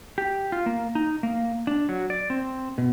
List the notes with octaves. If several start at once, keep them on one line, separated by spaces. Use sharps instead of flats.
G4
F4
A#3
D#4
A#3
D4
F#3
D5
C4
B2